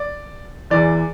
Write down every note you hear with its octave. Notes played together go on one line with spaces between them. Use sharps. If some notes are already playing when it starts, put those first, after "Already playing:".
Already playing: D5
E2 E3 D5